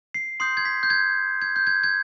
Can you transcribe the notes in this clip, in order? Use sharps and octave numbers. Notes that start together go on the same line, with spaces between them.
C7
C6 D#6 G6 C7
G#6
B6
G6
G#6
G#6
G6
G#6
G#6